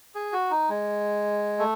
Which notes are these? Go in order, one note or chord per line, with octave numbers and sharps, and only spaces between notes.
G#4
F#4
D#4
G#3
A3